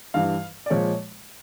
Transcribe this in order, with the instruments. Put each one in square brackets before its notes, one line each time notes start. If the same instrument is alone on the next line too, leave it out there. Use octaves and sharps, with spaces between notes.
[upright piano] G2 E3 G3 F5
D5
A#2 F3 G#3 C#5